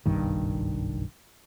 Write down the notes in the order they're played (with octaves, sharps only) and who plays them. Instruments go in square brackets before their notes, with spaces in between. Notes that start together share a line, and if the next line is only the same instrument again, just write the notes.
[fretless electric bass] F#1 B1 G2 D#3